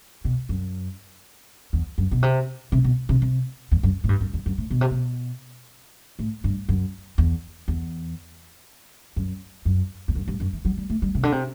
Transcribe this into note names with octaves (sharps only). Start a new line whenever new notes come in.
B2
F#2
E2
F#2
B2
C3
C3
B2
C3
C3
E2
F#2
A2
G2
F#2
E2
F#2
A2
B2
C3
B2
A2
G2
F#2
E2
E2
F#2
F#2
E2
F#2
G2
F#2
E3
F#3
G3
A3
G3
C3
D3
C3